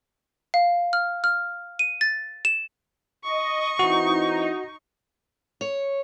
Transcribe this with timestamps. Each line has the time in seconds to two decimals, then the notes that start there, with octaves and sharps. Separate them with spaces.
0.54 F5
0.93 F6
1.24 F6
1.79 D#7
2.01 A6
2.45 E7
3.24 D#5 C#6
3.79 E3 C4 D#4 E4 F#4
5.61 C#5